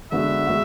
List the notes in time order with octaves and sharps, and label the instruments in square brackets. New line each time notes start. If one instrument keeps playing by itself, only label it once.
[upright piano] D3 G#3 B3 F#4 [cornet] E5
[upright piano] G#3 B3 F#4